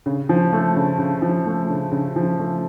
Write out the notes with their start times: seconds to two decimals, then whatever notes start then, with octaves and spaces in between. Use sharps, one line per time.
0.06 C#3
0.29 F3
0.53 A3
0.76 C#3
0.98 C#3
1.22 F3
1.46 A3
1.70 C#3
1.92 C#3
2.16 F3
2.39 A3